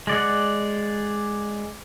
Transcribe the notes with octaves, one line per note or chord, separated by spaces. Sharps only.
G#3 D5 F#5